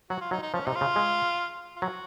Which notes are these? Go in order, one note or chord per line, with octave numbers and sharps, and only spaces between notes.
F#3 F#4
F4
F#3 D#4
D#4
F3 C#4
C3 D#4
F4
C#3
G#3
F4
F#3 F#4